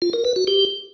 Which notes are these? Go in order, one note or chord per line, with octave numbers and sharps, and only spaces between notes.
F4
A#4
B4
F#4
G4